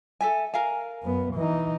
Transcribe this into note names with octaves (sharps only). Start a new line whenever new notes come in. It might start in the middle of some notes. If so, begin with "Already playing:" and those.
A4 E5 G#5
A#4 F5 G#5
F#2 B3
E3 D#4